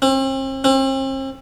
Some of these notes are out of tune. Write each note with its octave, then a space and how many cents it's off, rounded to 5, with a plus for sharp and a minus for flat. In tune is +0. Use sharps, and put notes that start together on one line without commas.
C4 +40
C4 +40